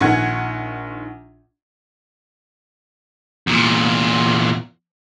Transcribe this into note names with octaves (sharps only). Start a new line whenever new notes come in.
A#1 D#3 F#5 G#6
E2 A#2